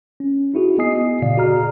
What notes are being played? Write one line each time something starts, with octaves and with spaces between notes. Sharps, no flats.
C#4
D#4 E4 F#4 G#4
B3 D#5 G#5 D#6 C7
A#2 C#3 D5 F5 C7
F#4 G#4 A#5 F6